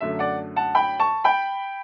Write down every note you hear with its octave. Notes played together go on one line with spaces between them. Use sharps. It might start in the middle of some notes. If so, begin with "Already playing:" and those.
F#2 D3 F#3 A3 E5
D5 F#5
F#5 A5
G5 B5
A5 C#6
G5 B5